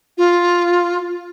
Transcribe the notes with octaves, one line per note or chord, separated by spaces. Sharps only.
F4